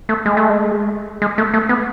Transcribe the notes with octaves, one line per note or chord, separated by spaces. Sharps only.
A3
G#3
A3
G#3
G#3
A3
A3
B3